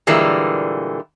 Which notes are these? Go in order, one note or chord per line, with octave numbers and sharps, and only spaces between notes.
A#2 D3 E3 G3 G#3 A#3